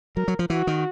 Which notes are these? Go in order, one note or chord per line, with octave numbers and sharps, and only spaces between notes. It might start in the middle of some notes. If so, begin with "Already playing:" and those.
F#3 A#4
F#3
F3
E3 F#4
D#3